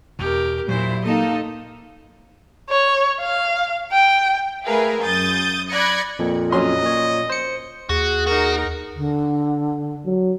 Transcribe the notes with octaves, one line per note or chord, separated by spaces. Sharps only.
E2 B2 G4 A#4
A#2 F#3 E4 C5
A#3 D#4 A4 D#5
C#5
F5
G5
A3 G#4 A#4 B4 E5 F5
F#2 D#6 G6 A6
D5 B5 F#6 G#6 A#6 C#7
F2 A#2
F#3 C#4 D#5 C6
A#2 C#5
C5 C#7
D#2 F#4 G#4
D#4 F#4 A#4
D3
F#3